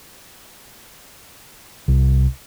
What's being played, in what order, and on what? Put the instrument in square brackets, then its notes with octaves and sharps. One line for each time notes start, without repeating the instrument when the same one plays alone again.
[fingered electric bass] C2